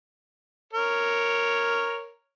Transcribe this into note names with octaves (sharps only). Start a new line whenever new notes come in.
A#4 C#5